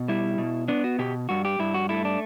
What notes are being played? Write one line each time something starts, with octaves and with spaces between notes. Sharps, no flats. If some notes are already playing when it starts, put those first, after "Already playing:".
Already playing: B2
G3 E4
B2
B3 D4
F#4
B2 G4
G2 F#4
G4
G2 E4
F#4
A3 E4
D4